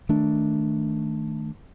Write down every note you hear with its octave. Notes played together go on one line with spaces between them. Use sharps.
D#3 A3 D4